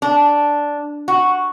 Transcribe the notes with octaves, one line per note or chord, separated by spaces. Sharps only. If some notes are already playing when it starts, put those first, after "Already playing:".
D4
F#4